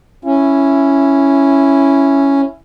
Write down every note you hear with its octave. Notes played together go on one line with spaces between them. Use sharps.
C#4 E4